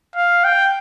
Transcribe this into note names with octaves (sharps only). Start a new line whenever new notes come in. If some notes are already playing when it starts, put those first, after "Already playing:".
F5
G5